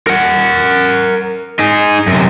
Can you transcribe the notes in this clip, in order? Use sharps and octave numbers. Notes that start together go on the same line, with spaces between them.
A#4 F#5
D#4 G#4
F#2 C3